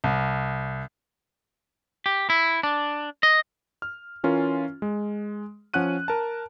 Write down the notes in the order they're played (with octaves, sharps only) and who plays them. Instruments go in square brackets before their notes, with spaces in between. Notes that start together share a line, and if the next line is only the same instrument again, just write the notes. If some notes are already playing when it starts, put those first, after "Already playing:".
[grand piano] C2
[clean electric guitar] G4
E4
D4
D#5
[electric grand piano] F6
E3 C#4 F4 A#4
G#3
F3 C#4 F#5 F#6 D#7
A#4 A5